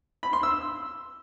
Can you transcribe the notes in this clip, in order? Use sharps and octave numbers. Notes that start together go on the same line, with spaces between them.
B5
C6
E6